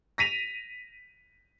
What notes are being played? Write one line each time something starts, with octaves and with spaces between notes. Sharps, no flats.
A#6 B6 D#7 F7